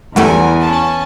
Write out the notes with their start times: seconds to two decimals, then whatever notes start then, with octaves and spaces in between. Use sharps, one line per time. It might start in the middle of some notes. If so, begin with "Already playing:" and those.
0.16 E2 G3 A3 E4 A#4 F#5 G#5
0.60 C#4 A5